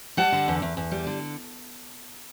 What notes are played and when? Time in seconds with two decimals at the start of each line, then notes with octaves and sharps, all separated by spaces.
0.17 G3 F#5 A5
0.32 D3
0.48 E2
0.62 E2
0.77 E2
0.92 G3
1.07 D3